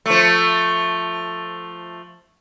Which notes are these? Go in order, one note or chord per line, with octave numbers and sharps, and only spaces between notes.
F3 A3